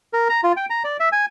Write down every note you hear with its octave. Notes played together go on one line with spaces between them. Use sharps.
A#4
A#5
F4
G5
A#5
D5
E5
G#5